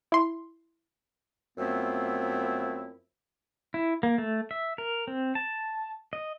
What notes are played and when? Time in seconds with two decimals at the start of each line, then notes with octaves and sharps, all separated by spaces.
0.12 E4 C6
1.58 F#2 F3 A3 B3 C4 E4
3.74 E4
4.03 A#3
4.18 A3
4.51 E5
4.78 A#4
5.08 C4
5.35 A5
6.13 D#5